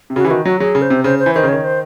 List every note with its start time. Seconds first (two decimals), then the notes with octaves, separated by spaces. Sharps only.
0.10 C3
0.16 C#3 F#4
0.24 E3 G#4
0.30 D#3 F#4
0.45 F#3 F#4
0.60 F#3 G#4
0.75 C#3
0.82 C5
0.90 C3
1.04 C#3 C5
1.19 C5
1.26 E3
1.35 D#3 C5
1.43 C#3
1.49 D#3 C#5
1.64 C5